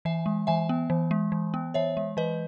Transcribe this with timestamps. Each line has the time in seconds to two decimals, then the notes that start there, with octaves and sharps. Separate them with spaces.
0.05 E3 E5 G#5
0.26 G#3
0.47 E3 E5 G#5
0.69 B3
0.90 E3
1.11 G#3
1.32 E3
1.54 B3
1.74 E3 C#5 E5
1.97 G#3
2.17 E3 B4 D#5